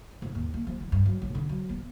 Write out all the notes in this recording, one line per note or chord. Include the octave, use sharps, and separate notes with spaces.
G#2
D#2
A#3
F3
E3
G2
F#3
A1
D3
F#3
B3